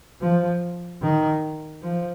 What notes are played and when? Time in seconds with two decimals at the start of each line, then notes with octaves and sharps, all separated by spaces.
0.22 F3
1.02 D#3
1.82 F3